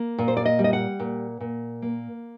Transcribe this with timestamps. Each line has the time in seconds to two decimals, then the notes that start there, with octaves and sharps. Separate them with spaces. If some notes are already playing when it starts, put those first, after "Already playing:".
Already playing: A#3
0.18 A#2
0.28 C5
0.37 D5
0.45 D#5
0.59 G3
0.64 D#5
0.73 F#5
1.00 A#2
1.40 A#2
1.82 A#3